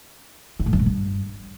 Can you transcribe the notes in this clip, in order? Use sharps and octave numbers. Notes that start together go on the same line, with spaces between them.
E3
A2
F#2
A#2
G2